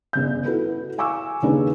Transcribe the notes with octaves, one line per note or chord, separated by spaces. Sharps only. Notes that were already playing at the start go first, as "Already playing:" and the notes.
G1 C#3 G6
E4 F#4 A4 B4
F5 G#5 C#6 D6 E6
D#2 C#3 D4 D#4 G#4 B4